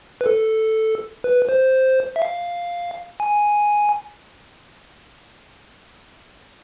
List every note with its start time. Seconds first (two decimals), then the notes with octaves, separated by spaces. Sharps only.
0.21 B4
0.26 A4
1.24 B4
1.49 C5
2.16 E5
2.22 F5
3.20 G#5